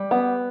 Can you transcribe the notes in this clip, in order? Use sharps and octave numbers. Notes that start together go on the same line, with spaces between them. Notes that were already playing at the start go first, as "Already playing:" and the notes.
Already playing: G3
B3